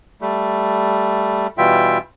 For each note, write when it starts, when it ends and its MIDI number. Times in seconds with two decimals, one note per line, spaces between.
0.21 1.47 55
0.21 1.47 57
1.58 1.98 47
1.58 1.98 52
1.58 1.98 55
1.58 1.98 65
1.58 1.98 76
1.58 1.98 79